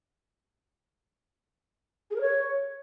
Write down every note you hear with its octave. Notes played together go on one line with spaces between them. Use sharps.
G#4
A#4
C#5